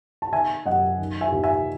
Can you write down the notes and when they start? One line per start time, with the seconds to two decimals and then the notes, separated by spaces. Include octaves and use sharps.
0.22 A5
0.33 D#3 E5 G#5
0.66 F#2 D#5 F#5
0.99 D#3
1.21 E5 G#5
1.32 D#2
1.43 E5 G#5